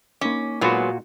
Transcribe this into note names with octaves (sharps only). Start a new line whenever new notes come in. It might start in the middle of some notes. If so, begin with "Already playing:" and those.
A#3 C#4 D#4 D6
A#2 F#3 G#3 B3 F4 F#4